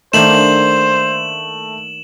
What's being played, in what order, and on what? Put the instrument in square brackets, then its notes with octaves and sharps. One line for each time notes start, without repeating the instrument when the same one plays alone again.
[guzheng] D#3 A#3 D4 [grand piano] A3 [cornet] C5 [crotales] E7 F#7